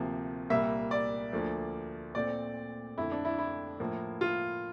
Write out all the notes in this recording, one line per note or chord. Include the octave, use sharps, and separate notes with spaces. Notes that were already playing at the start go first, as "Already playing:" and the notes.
Already playing: D2 C3 F3 A#3
C2 A#2 G3 A#3 E5
D5
D2 D3 F3 A#3
A#2 A3 C4 D5
F2 D3 A3 E4
D4
E4
E4
A2 F3 A#3
F4